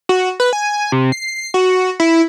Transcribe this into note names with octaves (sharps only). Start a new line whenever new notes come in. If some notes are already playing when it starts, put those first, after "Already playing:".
F#4
B4
G#5
C3
C7
F#4
E4